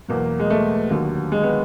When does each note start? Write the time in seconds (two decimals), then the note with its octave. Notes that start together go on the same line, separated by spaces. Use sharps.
0.08 E2 B2 F#3 A#3
0.39 G#3
0.50 A3
0.91 D#2 D3 F#3
1.32 G#3
1.43 B3